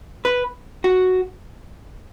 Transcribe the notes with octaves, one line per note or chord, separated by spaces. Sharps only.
B4
F#4